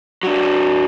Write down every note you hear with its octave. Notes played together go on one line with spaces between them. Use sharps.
F#3 D4